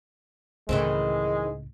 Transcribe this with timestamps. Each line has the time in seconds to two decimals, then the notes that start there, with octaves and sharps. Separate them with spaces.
0.69 C#2 A2 D#3 E3 G#3 C4